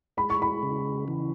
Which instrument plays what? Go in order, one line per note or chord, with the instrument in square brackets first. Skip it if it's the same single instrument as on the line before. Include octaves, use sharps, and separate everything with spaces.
[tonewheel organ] G#3 [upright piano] B5
[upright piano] C#6
B5
[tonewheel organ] C#3
E3